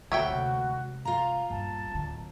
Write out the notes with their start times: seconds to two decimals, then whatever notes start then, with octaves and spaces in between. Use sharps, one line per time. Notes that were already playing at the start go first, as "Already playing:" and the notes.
0.12 D2 C#3 F#4 C#5 E5 G5
0.29 C3 G#3
1.05 F4 F5 A#5
1.50 A#1 G2 A5
1.90 D1 D3